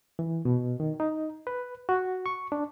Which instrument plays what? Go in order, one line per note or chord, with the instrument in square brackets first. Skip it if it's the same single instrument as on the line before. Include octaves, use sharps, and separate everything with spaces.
[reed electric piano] E3
B2
D#3
D#4
B4
F#4
C#6
D4